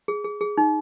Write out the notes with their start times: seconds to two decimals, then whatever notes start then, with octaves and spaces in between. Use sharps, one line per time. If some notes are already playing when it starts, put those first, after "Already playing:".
0.08 G#4
0.24 G#4
0.41 G#4
0.58 D#4